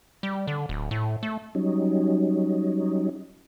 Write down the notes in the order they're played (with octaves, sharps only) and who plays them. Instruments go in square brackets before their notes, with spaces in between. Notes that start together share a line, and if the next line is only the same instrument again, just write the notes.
[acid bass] G3
D3
D1
A2
A3
[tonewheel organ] F#3 G3 C#4 D#4